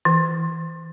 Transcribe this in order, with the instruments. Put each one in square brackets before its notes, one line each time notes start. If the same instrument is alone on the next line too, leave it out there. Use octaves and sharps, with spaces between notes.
[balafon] E3